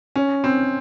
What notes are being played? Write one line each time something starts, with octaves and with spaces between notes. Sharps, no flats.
C#4
C4